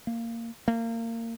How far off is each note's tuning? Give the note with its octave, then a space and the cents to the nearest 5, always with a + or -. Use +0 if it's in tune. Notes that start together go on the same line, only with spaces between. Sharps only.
A#3 -15
A#3 -25